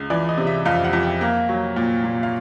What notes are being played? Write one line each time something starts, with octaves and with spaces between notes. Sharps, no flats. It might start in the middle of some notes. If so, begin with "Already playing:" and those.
Already playing: C#2
E3 D5
D#5
C3
E5
F2 F5
F#5
F2
G5
A#3
F#3
A#2
A#2
F5